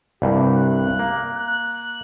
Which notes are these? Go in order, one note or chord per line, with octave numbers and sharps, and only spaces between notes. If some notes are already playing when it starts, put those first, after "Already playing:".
C2 G2 G4
F#6
A#3
F#6